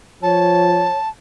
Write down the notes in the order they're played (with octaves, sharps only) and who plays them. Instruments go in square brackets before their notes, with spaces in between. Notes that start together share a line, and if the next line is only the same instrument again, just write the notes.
[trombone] F3 [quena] C#5 [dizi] A5